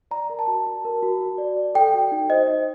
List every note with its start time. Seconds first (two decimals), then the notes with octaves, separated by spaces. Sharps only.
0.11 D5 A#5
0.30 A#4
0.39 A5
0.47 F#4
0.67 F#4
0.85 A#4
1.03 F#4
1.21 F#4
1.38 D5
1.57 D5
1.75 A4 G5
1.94 F#4
2.12 D#4
2.30 C5 D#5
2.48 D#4